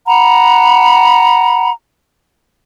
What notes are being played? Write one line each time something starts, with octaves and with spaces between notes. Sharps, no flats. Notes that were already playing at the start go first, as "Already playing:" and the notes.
F#5 A#5 B5